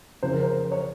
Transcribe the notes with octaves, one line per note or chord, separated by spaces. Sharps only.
F2 C#3 E3 C5
A#4
C5
C#5